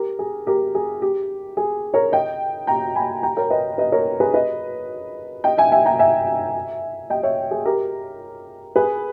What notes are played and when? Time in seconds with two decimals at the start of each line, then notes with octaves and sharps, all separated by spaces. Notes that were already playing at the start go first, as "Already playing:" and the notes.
Already playing: G4 A#4
0.19 G#4
0.47 G4 A#4
0.75 G#4
1.02 G4
1.57 G#4
1.94 A#4 C#5
2.12 D#5 G5
2.67 G5 A#5
2.95 G#5 B5
3.23 G5 A#5
3.37 A#4 C#5
3.50 B4 D#5
3.78 B4 D#5
3.92 A#4 C#5
4.20 G#4 B4
4.34 B4 D#5
5.44 D#5 G5
5.58 E5 G#5
5.72 E5 G#5
5.85 G5 A#5
5.99 E5 G#5
7.10 D#5 G5
7.23 C#5 E5
7.51 G#4
7.65 G4 A#4
8.76 G#4 B4